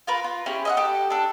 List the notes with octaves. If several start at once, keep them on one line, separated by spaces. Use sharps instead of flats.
F4 A#4 B4
F4
C#4 E4 G4 G#4
D#5 E5 F#5
G4 A4
D4 A4